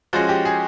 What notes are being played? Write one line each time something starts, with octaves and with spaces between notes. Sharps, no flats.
F3 G#3 C#4 F#4
G4
G#4